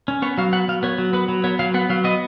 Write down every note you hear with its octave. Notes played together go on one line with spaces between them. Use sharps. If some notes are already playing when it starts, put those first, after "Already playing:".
C#4
B3 C#5
F#3 F5
B3 F#5
F#3 F5
B3 C#5
F#3
B3 B4
F#3
B3 C#5
F#3 F5
B3 F#5
F#3 F5
B3 D#5